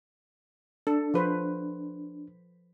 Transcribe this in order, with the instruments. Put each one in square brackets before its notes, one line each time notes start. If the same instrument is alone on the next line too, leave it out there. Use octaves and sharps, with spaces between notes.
[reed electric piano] D4 [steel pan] A4
[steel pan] F3 B4 C5